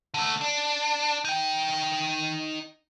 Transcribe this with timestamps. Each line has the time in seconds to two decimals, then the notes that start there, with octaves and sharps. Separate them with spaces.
0.14 D3 A3
0.41 D4
1.25 D#4 G5